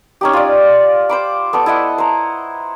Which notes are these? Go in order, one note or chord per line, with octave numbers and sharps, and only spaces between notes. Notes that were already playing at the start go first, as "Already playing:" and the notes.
C#4 D#4 G4
F4 D5
C5 B5 D6
B3 A4 D6
E4 D#5 E5 F#5
C5 A#5